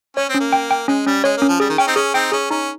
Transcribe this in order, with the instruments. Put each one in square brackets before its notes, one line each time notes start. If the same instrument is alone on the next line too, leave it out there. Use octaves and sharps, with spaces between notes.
[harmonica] C#4 [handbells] C#5
[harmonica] C4
[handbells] C#4
[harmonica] A#3
[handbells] G5
G5
[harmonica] G#3 [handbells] C#4
[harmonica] G3 [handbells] C#4
[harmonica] G#3 [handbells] C#5
[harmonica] A#3 [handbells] C#4
[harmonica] F3
[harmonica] G3 [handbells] G#4
[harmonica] D#3
[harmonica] C#4 [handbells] G5
[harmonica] C4 D#4
[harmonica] C#4 [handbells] G#4
[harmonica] C4 D#4 [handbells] G5
[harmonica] C#4 [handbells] G#4
[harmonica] C#4 [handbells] D#4